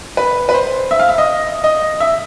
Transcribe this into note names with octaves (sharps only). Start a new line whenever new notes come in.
B4
B4
C5
E5
F5
E5
D#5
D#5
E5